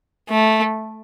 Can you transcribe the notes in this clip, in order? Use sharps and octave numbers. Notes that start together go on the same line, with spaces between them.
A3